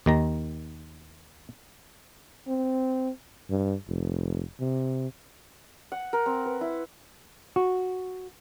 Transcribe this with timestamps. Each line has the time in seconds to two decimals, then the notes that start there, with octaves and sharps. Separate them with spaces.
0.06 D#2 D#3 A#5
2.48 C4
3.50 G2
3.88 F1
4.60 C3
5.92 F#5
6.13 A#4
6.26 C4
6.46 B4
6.61 E4
7.56 F#4